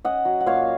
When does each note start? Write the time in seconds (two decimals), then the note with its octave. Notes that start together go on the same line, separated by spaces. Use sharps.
0.05 C#4 D#5 F#5
0.25 F#3
0.41 F#5
0.46 A#2 C#5 F5